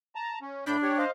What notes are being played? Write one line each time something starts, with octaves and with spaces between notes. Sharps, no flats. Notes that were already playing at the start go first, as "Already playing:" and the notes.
A5 A#5
C#4
A2 D4 B5 G6
G4 C#5
C5 D#5 F5